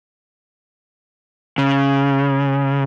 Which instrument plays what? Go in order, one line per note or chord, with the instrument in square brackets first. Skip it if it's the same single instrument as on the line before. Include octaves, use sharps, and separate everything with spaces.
[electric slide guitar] C#3